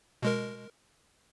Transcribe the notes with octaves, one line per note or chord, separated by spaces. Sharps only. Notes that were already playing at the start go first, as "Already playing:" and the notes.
B2 G#3 A#4